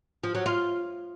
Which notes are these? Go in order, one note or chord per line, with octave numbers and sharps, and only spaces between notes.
F3
F#3
F4